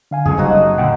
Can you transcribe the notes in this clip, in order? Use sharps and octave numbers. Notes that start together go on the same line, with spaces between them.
D3 F5 G#5
F#2 C#3 G#3 G#4 A4
F#1 G3 C4 D#4 F#4
F5 D#6
A#2 D3 F#5 G5